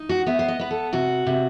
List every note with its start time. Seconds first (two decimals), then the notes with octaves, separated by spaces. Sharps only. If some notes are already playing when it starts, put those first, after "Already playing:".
Already playing: D#4
0.09 F#4
0.27 B3 E5
0.39 C5
0.48 D#5
0.60 B3 B4
0.71 A4
0.93 C3 F#4
1.27 C3